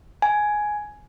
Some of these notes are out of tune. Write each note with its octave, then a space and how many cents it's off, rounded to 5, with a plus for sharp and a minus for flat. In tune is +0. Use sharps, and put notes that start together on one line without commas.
G#5 +10